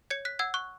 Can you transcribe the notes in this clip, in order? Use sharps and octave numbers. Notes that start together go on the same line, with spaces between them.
C#5 G#6 C#7
F#6 B6
F#5 E6 G#6
C#6 F#6